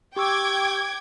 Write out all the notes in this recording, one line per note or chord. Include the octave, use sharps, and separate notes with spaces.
G4 G5 C#6 D6 E6 G#6